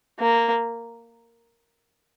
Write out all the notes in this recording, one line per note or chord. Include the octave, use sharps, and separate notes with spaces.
A#3